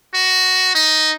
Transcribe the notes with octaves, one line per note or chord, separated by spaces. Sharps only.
F#4
D#4